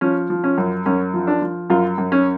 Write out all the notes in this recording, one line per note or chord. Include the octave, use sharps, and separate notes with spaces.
F3 C#4
F3
C#4
F#2
F#2 C#4
F3
D4
F3
F#2 F4
F#2
C#4